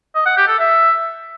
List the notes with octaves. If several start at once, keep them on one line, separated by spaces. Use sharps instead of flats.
D#5
F#5
G4
A4
E5